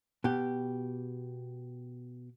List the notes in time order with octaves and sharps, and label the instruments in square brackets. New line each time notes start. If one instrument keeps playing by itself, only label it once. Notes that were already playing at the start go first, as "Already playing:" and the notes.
[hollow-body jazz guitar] B2 G4